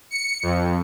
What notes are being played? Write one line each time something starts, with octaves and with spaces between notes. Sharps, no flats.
C#7
F2